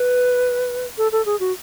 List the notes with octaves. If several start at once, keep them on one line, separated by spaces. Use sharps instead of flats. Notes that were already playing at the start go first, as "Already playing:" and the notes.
Already playing: B4
A4
A4
G#4
F#4